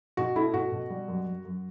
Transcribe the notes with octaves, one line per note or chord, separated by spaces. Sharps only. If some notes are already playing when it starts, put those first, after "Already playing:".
B2 F#4
A3 E4
B2 F#4
B2
G3
F#2
F#2
F#2